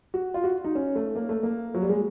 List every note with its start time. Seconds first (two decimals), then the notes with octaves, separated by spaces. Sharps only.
0.14 F#4
0.34 F4
0.44 F#4
0.64 D#4
0.75 C#4
0.96 A3
1.15 A#3
1.29 A3
1.43 A#3
1.75 F#3
1.82 G3
1.89 G#3